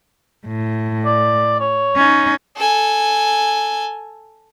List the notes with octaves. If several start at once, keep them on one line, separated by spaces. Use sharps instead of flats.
A2
D5
C#5
C#4 D#4
A4 G#5